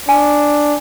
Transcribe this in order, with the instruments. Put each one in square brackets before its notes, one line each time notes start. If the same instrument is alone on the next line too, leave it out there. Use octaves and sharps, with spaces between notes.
[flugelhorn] D4 [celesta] G#5